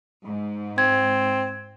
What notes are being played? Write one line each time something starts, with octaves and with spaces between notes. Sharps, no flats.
G#2
C4 G#6